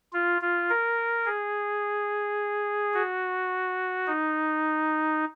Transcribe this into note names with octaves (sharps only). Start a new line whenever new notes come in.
F4
F4
A#4
G#4
F#4
D#4